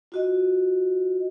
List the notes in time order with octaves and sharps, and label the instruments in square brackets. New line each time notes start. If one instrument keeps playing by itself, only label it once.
[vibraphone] F4 F#4 D#5